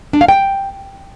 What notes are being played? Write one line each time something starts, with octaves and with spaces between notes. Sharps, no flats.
D4
F5
G5